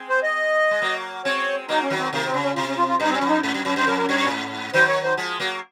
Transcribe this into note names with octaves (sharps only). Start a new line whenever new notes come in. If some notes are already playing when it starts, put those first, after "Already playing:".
Already playing: G#3 C4
C5
D#5
G#3
F#3 A#3
G#3 C4 C#5
F#3 A#3 D#4
C#4
D#3 F#3
C4
C3 D#3 A#3
C4
C#3
C#4
C3 F4
C#4
F4
F4
F#2 D#4
C4
C#4
F2
D#4
G#2
F#2
F2
F#2 C5
F2 A#4
A#4
F#2 C#5
C#5
A#2
G#2
D#3 F#3 C5
C#5
C5
F3 G#3
F#3 A#3